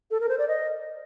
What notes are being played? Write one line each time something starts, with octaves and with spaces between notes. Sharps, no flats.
A4
A#4
C5
D5
D#5